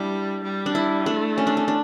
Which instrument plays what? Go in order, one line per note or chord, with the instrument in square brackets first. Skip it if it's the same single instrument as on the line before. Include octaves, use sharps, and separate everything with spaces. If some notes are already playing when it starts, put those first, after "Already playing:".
Already playing: [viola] G3 [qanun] D4 E4
[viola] G3
[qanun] D4
E4
[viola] A3 [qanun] D4
[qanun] C#4
D4
C#4
D4